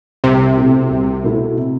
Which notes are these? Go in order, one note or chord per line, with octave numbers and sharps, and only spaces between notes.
C2 C3
B2 A3 E4
C2
B2 A3 E4
C3